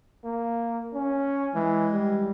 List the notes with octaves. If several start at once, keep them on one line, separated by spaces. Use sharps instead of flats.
A#3
C#4
E3 G#3
G3